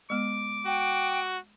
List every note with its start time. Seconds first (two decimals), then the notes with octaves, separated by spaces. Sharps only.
0.10 G#3 B3 D6
0.66 F#4 G5